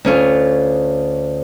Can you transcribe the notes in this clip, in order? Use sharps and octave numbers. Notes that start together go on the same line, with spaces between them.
D2 C#4 F4